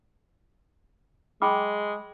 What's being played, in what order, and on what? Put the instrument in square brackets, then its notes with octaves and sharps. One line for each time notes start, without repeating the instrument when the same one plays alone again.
[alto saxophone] G#3 [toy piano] G5 B5 D6